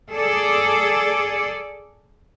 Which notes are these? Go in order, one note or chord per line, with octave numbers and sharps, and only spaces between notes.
G#4 A4 D5